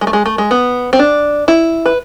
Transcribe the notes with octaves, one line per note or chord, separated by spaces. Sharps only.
G#3
A3
G#3
A3
G#3
B3
C4
D4
E4
B4